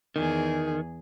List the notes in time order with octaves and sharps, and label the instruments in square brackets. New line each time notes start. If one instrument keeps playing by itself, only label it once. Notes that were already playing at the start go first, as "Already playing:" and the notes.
[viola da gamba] E2 G#4 [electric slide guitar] D#3